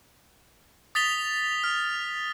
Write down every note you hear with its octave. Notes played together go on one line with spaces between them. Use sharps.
D#6 A6 B6 F7 G7
F6